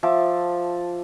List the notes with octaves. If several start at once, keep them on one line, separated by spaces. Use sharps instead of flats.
F3 E5 A5 D6